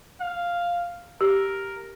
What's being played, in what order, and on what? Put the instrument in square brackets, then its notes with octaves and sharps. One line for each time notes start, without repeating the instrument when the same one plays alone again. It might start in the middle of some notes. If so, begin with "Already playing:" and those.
[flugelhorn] F5
[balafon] G4 [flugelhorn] A#4